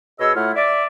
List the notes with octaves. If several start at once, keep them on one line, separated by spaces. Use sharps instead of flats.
B2 G#4 C#5 D#5 E6
A2 A3 E4 F4 F#5 F6
D5 E5